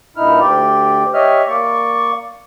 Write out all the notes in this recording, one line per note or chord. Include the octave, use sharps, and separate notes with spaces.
G2 A#2 D#4 E4 F6
D2 G4 D5
G4 C#5 D#5 E5 F6
A#3 D5 C#6